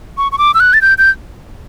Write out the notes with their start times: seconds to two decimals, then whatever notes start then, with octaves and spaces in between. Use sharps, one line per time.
0.18 C#6
0.32 C#6
0.38 D6
0.54 E6
0.60 F#6
0.74 A6
0.82 G6
0.98 G6